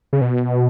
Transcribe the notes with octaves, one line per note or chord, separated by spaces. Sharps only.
C#3
B2